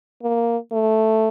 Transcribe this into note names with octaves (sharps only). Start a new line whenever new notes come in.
A#3
A3